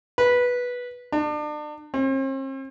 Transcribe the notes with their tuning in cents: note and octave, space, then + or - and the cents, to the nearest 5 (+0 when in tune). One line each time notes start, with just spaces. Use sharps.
B4 -10
D4 +35
C4 +45